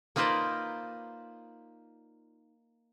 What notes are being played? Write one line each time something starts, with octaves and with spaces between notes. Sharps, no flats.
A#3 D#4 F4 B4 C5 D5